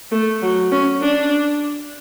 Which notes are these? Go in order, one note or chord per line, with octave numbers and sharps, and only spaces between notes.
A3
F#3
C#4
D4